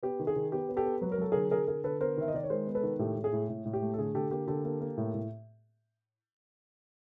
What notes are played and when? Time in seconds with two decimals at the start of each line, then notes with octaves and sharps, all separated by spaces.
0.03 B3 G4
0.19 D#3
0.27 G#4
0.36 D#3
0.52 B3 G4
0.69 B3
0.77 G4 A4
0.85 B3
1.01 F#3 B4
1.12 A#4
1.18 F#3 A4
1.32 D3 G#4 A#4
1.51 D3 G#4 A#4
1.68 D3 G#4 A#4
1.84 D3 A4 B4
2.01 B3 A#4 C5
2.17 D#3 E5
2.28 D#5
2.34 D#3 D5
2.43 C#5
2.50 G#3 A#4 C5
2.67 B3
2.75 A4 B4
2.83 D#3
2.99 A2 G4 A4
3.16 A2
3.24 G#4
3.33 A2
3.49 A2
3.65 A2
3.73 G4
3.82 A3
3.94 A4
3.99 D3 G#4
4.15 D3 G4 A4
4.31 A#3 G4
4.48 D3 G4 A4
4.64 A#3
4.81 A#3
4.97 A2
5.14 A2